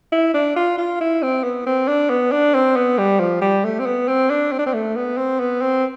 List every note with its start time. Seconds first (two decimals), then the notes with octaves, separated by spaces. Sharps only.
0.12 E4
0.34 D4
0.56 F4
0.78 F4
1.01 E4
1.22 C4
1.44 B3
1.67 C4
1.88 D4
2.10 B3
2.32 D4
2.54 C4
2.76 B3
2.98 G3
3.20 F3
3.42 G3
3.65 A3
3.79 C4
3.86 B3
4.08 C4
4.30 D4
4.52 C4
4.59 D4
4.66 C4
4.74 A3
4.96 B3
5.17 C4
5.40 B3
5.62 C4